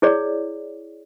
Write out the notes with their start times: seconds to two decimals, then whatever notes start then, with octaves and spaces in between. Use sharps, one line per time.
0.02 E4 G#4 C#5 D5